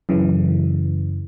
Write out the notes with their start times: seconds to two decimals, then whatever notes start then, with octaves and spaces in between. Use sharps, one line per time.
0.09 F#2 C#3 E3